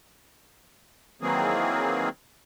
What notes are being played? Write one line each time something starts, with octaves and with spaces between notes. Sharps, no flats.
D#3 E3 F#3 A#3 C4 G#4